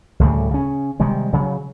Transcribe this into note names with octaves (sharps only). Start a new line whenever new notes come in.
D2 A2 C#3 G3
C#3 C#4
C3 D#3 G3 G#3
C#3 F#3